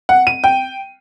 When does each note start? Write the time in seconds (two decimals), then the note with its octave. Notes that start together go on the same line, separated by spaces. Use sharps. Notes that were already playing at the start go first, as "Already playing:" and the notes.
0.09 F#5
0.27 D#7
0.44 G5